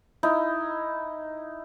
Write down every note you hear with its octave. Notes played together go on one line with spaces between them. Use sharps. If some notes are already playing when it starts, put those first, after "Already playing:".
D#4 E4